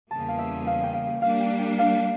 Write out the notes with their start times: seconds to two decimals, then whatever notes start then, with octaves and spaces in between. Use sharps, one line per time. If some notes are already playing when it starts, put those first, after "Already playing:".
0.10 E2 C#3 G3 A#3 A5
0.28 F5
0.39 E5
0.67 F5
0.83 G5
0.94 F5
1.22 G3 A#3 D4 F5
1.41 G5
1.59 G5
1.79 F5